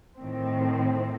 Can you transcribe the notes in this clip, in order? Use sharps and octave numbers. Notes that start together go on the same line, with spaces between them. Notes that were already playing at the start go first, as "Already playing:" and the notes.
A2 D#3 C4